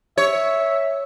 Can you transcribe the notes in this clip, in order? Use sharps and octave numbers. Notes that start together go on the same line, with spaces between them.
C#5 E5